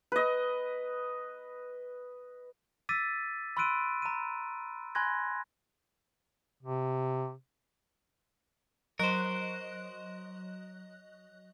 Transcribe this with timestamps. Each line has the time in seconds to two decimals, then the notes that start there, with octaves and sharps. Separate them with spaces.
0.12 B4 D#5
2.89 D6 E6 A6 B6 D#7
3.57 B5 C6 E6 F#6 D7 D#7
4.02 A#5 D#7
4.95 G#5 B5 C6 F#6 G#6 A#6
6.63 C3
8.99 F#3 A#4 C5 D#5 F#6